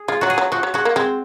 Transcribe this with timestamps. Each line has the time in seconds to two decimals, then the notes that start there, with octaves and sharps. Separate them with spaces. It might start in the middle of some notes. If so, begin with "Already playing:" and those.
Already playing: G#4
0.08 G#3 F4
0.21 F#3 F#4
0.30 G#4
0.38 F#3
0.52 F3 F#4
0.63 F#3
0.74 G#3 F#4
0.85 A#3
0.96 G#3 C4